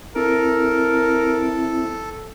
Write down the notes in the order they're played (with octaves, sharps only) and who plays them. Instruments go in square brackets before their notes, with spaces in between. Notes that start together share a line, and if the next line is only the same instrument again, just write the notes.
[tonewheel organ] C4 E4 [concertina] A4 [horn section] A#4